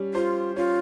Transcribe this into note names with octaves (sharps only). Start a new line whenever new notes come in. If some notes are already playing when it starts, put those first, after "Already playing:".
Already playing: G3 C#4
F4 C5
C#4 F4